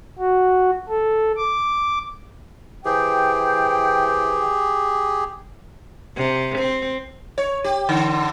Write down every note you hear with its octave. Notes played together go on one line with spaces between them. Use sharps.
F#4
A4
D6
E3 G4 G#4 C5 G5
C3
C4
C#5
G4
D3